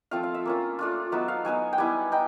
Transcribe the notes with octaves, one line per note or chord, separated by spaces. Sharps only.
F3 A3 C4 F4 F5
F5
E5
A#3 C#4 F4
A3 D4 F4
F#3 B3 D#4 E5
F5
F#3 B3 D#4 G#5
G5
G3 B3 E4 G#5
D#4 G5